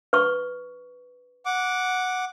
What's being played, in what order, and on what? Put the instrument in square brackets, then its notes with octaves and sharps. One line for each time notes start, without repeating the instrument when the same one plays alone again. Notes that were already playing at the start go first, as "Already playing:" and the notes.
[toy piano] B4 C#6
[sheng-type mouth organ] F#5 D6